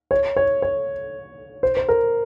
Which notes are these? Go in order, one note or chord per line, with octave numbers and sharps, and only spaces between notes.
C#5
C#5
C#5
C5
C5
A#4